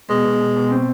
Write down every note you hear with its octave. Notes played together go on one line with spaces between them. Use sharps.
B2 G#3
B2
B2
B2
C4